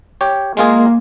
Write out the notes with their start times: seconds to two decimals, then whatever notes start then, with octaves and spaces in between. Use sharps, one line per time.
0.21 G4 C#5
0.57 G#3 A#3 F4 G#4